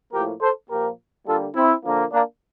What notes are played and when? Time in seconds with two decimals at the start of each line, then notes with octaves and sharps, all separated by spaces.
0.12 A2 F3 A#3 G4 A#4
0.41 A4 C5
0.69 A#2 F3 A#3 G4 A#4
1.26 D3 G3 A#3 F4 A4
1.55 C4 E4
1.84 D3 F3 A#3
2.12 A#3 D4